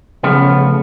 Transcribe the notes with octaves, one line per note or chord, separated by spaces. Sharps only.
C#3 F3 A3 B3